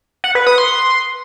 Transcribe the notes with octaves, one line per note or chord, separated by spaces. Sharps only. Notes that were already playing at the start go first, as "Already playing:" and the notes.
F#5
B4
D#6
C6